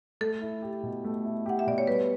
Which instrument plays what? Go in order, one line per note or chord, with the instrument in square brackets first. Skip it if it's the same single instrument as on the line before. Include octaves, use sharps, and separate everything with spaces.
[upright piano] A3 [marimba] A4
[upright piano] E4
G4
B2
A3
E4
[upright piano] G4 [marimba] F#5
[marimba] E5
[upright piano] B2 [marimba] D5
[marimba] C#5
[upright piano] G3 [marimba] B4